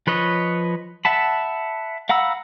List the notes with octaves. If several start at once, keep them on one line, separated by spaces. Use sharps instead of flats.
F3 B4 C#5 D#5
E5 F#5 A5 B5
F5 F#5 A#5 B5 E6